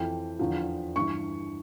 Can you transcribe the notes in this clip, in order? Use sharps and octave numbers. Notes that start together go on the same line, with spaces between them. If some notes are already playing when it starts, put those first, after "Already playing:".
Already playing: F2 E3 G5
E2 D3 F3
G2 E3 C#6